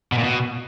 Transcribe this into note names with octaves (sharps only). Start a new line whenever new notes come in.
B2
A#2
B2